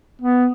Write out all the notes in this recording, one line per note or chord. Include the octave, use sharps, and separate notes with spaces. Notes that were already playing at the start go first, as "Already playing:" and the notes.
B3